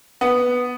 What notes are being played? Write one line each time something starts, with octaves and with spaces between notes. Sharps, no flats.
B3